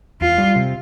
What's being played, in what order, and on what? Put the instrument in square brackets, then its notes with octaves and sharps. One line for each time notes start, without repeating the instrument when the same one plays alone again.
[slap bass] E2 [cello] F4
[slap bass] G3
C3